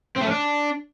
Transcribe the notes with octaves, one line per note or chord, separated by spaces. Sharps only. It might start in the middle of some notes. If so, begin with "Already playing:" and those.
C4
A3
C#4
D4